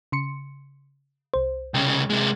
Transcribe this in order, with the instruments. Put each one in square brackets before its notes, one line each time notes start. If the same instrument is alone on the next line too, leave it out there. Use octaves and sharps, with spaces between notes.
[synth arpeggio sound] C#3 C6 C#7
C2 C5
[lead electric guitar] C2 C#3 [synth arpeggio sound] G5
[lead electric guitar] C3 G#3